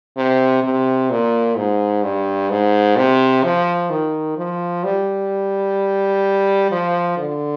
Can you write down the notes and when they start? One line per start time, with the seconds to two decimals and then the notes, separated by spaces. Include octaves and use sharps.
0.17 C3
0.63 C3
1.10 A#2
1.57 G#2
2.03 G2
2.50 G#2
2.97 C3
3.44 F3
3.90 D#3
4.37 F3
4.84 G3
6.71 F3
7.18 D3